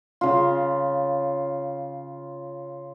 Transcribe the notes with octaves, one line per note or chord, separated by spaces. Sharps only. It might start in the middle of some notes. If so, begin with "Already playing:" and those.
C#3 F4